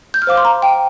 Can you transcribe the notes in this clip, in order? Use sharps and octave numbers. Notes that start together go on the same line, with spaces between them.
G6
F6
C5 F5 D6
C6
A#5
G5